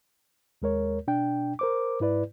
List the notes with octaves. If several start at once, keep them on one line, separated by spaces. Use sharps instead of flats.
D#2 G#3 A#4 C#5
B2 D4 G5
A#4 C5 D6
G#2 E4 B4 D5